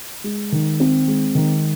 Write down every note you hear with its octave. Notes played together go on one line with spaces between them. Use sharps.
G#3
D#3
C4
G#3
D#3